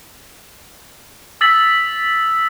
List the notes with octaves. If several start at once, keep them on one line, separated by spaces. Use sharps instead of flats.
D#6 E6 A6 B6 F#7